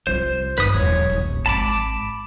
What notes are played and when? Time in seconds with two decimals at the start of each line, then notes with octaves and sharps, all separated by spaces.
0.07 C2 F4 C5
0.58 G1 B4 D#6
0.74 D#1 F#2 C#5
1.10 D#1 A#1
1.46 G#1 A5 B5 D6